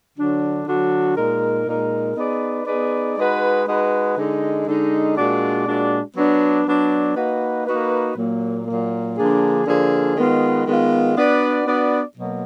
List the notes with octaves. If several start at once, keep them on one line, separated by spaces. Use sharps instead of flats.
D3 F#3 D4 F#4
D3 F#3 D4 F#4
A#2 G#3 D#4 A#4
A#2 G#3 D#4 A#4
B3 D#4 G#4 B4 D5
B3 D#4 G#4 B4 D5
G#3 D#4 F#4 B4
G#3 D#4 F#4 B4
D3 G#3 D#4
D3 G#3 D#4
A#2 G#3 D4 F#4 D5
A#2 G#3 D4 F#4 D5
F#3 B3 D4
F#3 B3 D4
A#3 D#4 F#4 B4
A#3 D#4 F#4 B4
A#2 F#3 A#3
A#2 F#3 A#3
D3 F3 A#3 D4 G#4
D3 F3 A#3 D4 G#4
D#3 G#3 B3 F4
D#3 G#3 B3 F4
B3 D4 F#4 B4 D5
B3 D4 F#4 B4 D5
B2 F#3 A#3